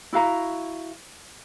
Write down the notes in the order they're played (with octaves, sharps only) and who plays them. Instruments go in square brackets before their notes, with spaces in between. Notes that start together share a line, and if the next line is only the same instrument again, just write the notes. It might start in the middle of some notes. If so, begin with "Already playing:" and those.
[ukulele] E4 F#4 F5 A#5